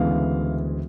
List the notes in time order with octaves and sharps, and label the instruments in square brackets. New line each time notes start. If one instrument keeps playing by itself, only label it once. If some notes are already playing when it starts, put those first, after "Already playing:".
Already playing: [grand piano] D2 C#3 E3 G#3 B3 F5